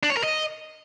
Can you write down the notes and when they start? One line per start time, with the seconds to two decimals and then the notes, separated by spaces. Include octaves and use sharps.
0.03 D4
0.10 C#5
0.17 A#4
0.23 D#5